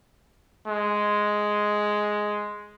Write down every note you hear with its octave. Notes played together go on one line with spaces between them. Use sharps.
G#3